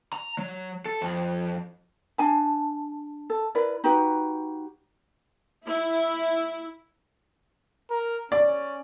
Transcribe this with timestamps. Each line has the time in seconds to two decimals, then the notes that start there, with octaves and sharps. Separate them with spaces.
0.13 A#5
0.38 F#3
0.86 A4
1.02 F2
2.18 D4 G#5 A5
3.30 A4
3.55 E4 A#4 B4 D5
3.84 D#4 F#4 G4 B4
5.66 E4
7.91 A#4
8.32 C#4 D5